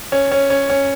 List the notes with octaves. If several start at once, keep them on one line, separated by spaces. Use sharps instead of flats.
C#4
C#4
C#4
C#4